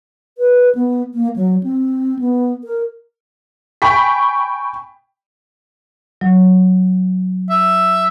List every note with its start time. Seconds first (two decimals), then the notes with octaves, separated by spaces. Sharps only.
0.38 B4
0.75 B3
1.14 A#3
1.36 F#3
1.63 C4
2.19 B3
2.64 A#4
3.82 G5 G#5 B5 C#6 B6
6.21 F#3
7.50 E5